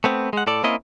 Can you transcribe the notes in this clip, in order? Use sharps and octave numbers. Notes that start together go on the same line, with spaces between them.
A3 B3 C4
G#3 F#5
A2 A4 D5
A#3 C4 C#4 E4 D#5